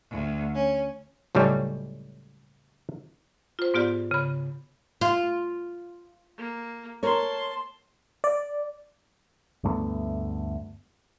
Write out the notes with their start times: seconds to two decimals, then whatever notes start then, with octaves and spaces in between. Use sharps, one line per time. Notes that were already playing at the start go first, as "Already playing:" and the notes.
0.11 D2
0.53 C#4
1.35 C#2 A2 F#3 G3 C#4
3.59 F4 C5
3.74 G#2 B3 F4 G4 D5
4.11 C#3 B5
5.01 F4 F5
6.37 A#3
7.03 A#4 C#5 A5 C6
8.24 D5
9.64 D2 G2 A3 B3